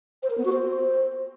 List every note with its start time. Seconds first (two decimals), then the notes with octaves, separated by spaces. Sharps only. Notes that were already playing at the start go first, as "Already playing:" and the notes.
0.23 C5
0.30 A#4
0.38 B3
0.45 F#4
0.52 C5